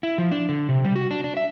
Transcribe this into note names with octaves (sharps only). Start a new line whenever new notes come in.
E4
F3
D4
D3
C3
G3
F#4
D4
D4
E5